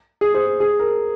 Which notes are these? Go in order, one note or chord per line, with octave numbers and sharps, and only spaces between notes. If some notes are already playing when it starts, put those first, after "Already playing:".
G#4
G#4 C5
G#4
A#4